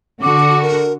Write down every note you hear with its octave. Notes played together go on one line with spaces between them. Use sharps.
D3 F#4 D6
A#4